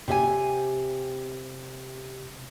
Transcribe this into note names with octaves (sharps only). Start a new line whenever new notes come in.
C3 G4 D#5 G#5